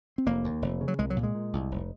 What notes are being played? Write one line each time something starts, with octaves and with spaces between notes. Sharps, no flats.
C4
F1 A#3
D#2
F1
C#3
F#3
C2 G#3
F#3
A#2
G#3
A#2
C2
F1